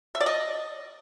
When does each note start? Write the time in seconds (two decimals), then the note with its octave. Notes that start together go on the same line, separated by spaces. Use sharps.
0.15 E5
0.21 D5
0.26 D#5